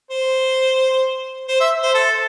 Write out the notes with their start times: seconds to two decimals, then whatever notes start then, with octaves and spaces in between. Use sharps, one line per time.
0.11 C5
1.48 C5
1.60 E5
1.83 C5
1.94 A4